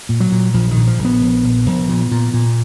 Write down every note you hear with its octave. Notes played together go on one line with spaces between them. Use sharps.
A#2
F#3
A#2
A#1 F3
D#3
A#2
F3
A#1
B3
A#1
A#1
A#1
A#2
A#2
A#2